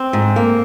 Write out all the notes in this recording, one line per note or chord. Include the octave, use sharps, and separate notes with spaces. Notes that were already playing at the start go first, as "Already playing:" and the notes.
Already playing: C4
G#2
A#3